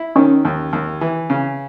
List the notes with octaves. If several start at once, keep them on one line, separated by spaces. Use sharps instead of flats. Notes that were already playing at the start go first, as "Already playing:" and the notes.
Already playing: E4
D#3 C#4 D#4
D#2
D#2
E3
C#3